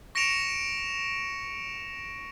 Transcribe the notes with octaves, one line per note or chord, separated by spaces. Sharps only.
C#6 A#6 C#7 D7 E7 F7